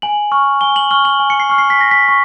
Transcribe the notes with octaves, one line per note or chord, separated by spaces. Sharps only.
G#5 F#7
C#6 F6
G#5 G7
F#7
C#6 F6 G7
F#7
G#5
C#7
C7
C#6 F6
C7
B6
G#5 A#6
B6
C#6